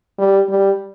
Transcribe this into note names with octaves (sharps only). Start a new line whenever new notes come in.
G3
G3